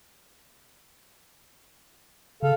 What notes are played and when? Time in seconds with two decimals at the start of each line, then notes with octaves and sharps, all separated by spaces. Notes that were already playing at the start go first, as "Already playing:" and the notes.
2.43 C#3 A4 F5